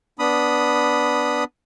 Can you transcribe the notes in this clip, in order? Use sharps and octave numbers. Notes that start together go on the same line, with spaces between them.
B3 D4 B5 D#6